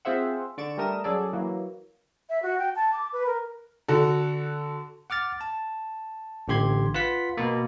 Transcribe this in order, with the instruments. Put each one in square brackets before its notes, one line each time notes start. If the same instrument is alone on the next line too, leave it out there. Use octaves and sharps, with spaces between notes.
[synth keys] C4 F4 G#4 C5 E5 F#5
D3 D5 C#6 D7 E7
G3 A3 A#4 D#6 E7
F#3 C#4 G#4 A4 D5
E3 F#3 A#3
[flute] E5
F#4
G5
A5
D6
B4
A#4
[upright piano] D3 F#4 A4
[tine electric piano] F#5 D6 F6 A6
A5
A1 D3 G4 C6 G#6
F4 B4 F#5 B6
B2 A#3